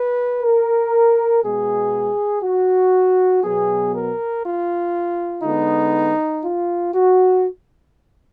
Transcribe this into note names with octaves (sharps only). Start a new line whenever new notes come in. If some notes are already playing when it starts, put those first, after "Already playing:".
Already playing: B4
A#4
B2 G#3 B3 G#4
F#4
B2 F#3 B3 G#4
A#4
F4
D3 G#3 B3 D#4
F4
F#4